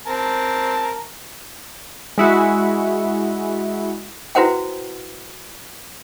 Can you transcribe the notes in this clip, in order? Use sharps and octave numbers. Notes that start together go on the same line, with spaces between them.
C4 A#4 A5
G#3 E4 F#4
E4 F#4 B4 C5 F#5 G5